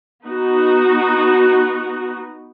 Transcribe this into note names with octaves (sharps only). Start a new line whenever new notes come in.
B3 D#4 F#4